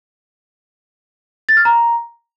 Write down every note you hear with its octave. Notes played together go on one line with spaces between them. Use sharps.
A6
F6
A#5